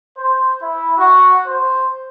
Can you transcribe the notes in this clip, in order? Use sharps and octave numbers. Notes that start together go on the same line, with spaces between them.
C5
E4
F#4
C5